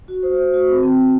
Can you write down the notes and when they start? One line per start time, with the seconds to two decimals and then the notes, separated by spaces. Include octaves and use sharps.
0.08 F#4
0.23 C5
0.38 C5
0.54 F#4
0.68 C4
0.83 C4
0.98 C4